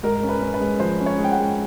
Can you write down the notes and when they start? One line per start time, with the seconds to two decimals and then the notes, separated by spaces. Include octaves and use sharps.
0.03 G#2 A#4
0.23 C#4
0.29 B4
0.42 C#4
0.54 B4
0.61 G#3
0.80 F3 C5
1.00 C#4
1.06 C#5
1.19 G#3
1.24 G5
1.32 F#5
1.38 G#3